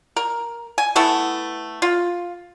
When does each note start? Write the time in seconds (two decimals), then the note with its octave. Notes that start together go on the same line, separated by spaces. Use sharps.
0.16 A#4
0.78 G#5
0.96 A3 B3 E4 A4
1.82 F4